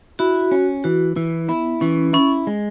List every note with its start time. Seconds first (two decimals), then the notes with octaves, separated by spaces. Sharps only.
0.19 E4 F#4
0.51 C#4
0.84 E3 F#4
1.16 E3 E4
1.49 B3 E4
1.81 E3 C#4
2.13 C#4 E4
2.47 G#3